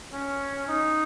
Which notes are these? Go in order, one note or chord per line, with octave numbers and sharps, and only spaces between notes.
C#4
D#4